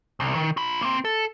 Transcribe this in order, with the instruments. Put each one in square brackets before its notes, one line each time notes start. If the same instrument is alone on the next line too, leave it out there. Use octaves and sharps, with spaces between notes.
[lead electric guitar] C2
D#3
F4 B5
A#3 C4
A4